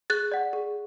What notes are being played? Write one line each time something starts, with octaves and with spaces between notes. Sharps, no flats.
G#4 F#6 A6
D5 F#5
G#4